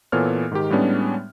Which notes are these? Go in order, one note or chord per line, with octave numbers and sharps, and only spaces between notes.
A#2 E3 B3 A4 C#5 F6
G#2 D#3 G4
A2 G3 G#3 B3 C#4 D4